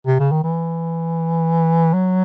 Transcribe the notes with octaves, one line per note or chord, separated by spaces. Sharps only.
C3
C#3
D#3
E3
F#3